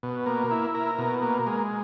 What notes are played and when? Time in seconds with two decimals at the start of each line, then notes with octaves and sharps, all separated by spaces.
0.03 B2
0.26 A#3
0.51 E4
0.75 A#4
0.99 B2
1.23 A#3
1.47 G#3